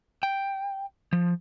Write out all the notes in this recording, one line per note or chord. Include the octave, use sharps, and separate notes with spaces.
G5
F3